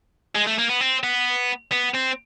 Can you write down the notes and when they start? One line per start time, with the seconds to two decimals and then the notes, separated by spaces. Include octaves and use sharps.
0.35 G#3
0.47 A3
0.59 A#3
0.70 B3
0.81 C4
1.03 B3
1.71 B3
1.94 C4